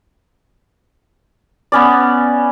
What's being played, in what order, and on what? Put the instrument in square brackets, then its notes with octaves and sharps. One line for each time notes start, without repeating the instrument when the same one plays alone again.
[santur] B3 C#4 D5